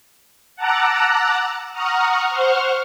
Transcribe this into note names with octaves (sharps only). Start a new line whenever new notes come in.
F#5 A5 A#5 D6 E6 F#6
F#5 A#5 C#6 D#6 F6
C5 F#5 C#6 F6